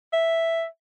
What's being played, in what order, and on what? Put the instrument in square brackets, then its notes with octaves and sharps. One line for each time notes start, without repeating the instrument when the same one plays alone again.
[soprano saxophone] E5